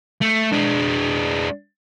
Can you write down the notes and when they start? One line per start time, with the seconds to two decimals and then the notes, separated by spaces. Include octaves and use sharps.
0.22 A3
0.53 G#3 D4